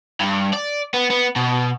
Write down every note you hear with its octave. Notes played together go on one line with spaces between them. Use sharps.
G2
D5
B3
B3
B2